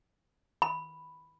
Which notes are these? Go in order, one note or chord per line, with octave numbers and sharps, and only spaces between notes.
B5